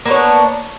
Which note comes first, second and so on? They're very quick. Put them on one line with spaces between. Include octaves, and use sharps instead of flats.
A#3 B3 C#5 D4